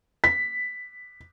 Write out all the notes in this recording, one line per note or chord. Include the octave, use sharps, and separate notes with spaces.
B6